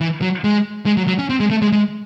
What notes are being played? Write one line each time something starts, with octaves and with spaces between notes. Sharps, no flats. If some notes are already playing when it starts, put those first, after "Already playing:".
E3
F#3
G#3
G#3
F#3
F#3
C#4
C4
G#3
A3
G#3
G#3